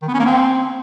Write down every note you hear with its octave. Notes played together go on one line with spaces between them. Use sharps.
D#3
B3
C#4
A#3
C4